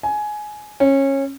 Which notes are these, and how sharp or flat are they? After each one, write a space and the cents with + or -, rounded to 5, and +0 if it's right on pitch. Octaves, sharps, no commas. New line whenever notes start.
G#5 +15
C#4 -20